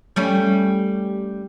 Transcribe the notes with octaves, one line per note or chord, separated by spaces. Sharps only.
G3 A3 C#4